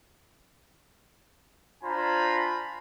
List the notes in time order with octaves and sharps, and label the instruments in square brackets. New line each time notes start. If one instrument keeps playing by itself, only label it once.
[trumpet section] D4 F4 C5 G#5 A#5 B5